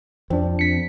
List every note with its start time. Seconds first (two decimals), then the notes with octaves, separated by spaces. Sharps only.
0.30 F2 C4 D4
0.59 B6 C#7